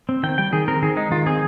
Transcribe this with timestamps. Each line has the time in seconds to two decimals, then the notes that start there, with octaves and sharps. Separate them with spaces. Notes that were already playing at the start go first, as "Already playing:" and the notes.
0.09 C4
0.23 D#3 G5
0.38 G3 G5
0.53 D#3 G#4
0.68 C4 A#4
0.82 D#3 G#4
0.97 G#3 D#4
1.11 D#3 F4
1.26 C4 G#4